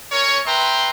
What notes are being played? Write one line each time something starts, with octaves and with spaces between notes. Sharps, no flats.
C#4 A#4 C#5
B4 E5 G5 A#5 C6